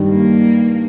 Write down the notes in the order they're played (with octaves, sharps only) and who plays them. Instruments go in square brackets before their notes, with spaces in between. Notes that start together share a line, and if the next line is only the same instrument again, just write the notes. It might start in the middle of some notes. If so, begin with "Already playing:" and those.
Already playing: [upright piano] G2 D#3 G3
[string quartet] A#3